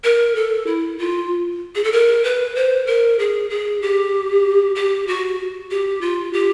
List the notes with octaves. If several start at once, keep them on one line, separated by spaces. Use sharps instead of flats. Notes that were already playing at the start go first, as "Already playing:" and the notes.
A#4
A4
E4
F4
G#4
A4
A#4
B4
C5
A#4
G#4
G#4
G4
G4
F#4
G4
F4
G4